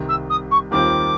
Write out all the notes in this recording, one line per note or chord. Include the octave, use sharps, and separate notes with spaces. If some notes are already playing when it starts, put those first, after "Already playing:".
Already playing: C2 C3 D#3
E6
D#6
C#6
D#2 D#3 G3 C4 F4 D6